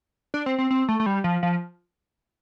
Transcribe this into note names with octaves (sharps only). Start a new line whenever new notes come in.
D4
C4
C4
C4
A3
A3
G3
F3
F3